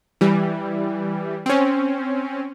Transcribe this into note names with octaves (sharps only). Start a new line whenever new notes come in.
E3 G3
C4 C#4